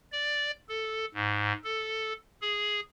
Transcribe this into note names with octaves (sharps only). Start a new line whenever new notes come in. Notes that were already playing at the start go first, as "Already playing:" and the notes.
D5
A4
G#2
A4
G#4